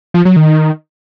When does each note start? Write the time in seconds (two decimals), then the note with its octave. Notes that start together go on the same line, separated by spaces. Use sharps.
0.14 F3
0.25 F#3
0.36 D#3